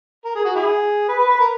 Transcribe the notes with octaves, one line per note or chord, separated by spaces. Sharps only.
A#4
G#4
F#4
E4 G#4
B4
B4
B4
A#4